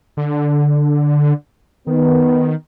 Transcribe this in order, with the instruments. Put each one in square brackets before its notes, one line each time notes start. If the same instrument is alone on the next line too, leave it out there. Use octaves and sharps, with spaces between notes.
[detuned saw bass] D3
[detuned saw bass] D#3 [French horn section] B3